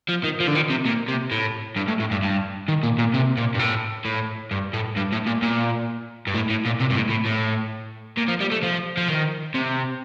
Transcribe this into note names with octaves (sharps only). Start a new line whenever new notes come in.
F3
D#3
F3
D3
D#3
C3
A#2
C3
A2
G2
A2
A2
G2
G2
D#3
A#2
A#2
C3
A#2
G2
A2
A2
G2
A2
G2
A2
A#2
A#2
G2
A2
A2
A#2
C3
G2
A2
A2
A2
A#2
F3
G3
A3
F3
F3
D#3
C3